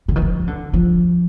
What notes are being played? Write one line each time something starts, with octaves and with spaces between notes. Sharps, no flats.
D3
D#3
F3
D3
F3